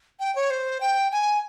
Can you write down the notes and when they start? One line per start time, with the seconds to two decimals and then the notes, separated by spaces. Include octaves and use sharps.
0.20 G5
0.36 C#5
0.50 C5
0.81 G5
1.12 G#5